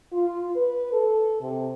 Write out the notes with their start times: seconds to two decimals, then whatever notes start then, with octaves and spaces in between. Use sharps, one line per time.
0.12 F4
0.56 B4
0.92 A4
1.42 C3